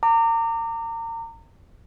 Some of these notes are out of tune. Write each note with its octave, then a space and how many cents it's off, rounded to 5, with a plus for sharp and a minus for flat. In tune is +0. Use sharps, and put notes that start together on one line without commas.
A#5 -35 D6 +10